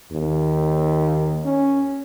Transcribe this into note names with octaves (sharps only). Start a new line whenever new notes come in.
D#2
C#4